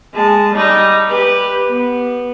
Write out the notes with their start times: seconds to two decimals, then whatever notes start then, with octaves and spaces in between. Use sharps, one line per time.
0.14 G#3 A5
0.54 G3 D#4
1.08 G4 B4
1.69 B3